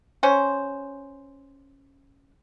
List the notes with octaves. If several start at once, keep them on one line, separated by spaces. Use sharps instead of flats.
C#4 C5